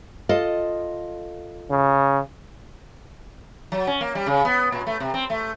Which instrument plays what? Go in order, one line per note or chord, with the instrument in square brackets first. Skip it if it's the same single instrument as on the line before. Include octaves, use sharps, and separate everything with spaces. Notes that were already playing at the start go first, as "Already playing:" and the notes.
[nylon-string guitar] F4 A4 D#5
[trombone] C#3
[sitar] F#3
C#4
A#3
G3
C#3
B3
A#2
A3
C3
C4
A3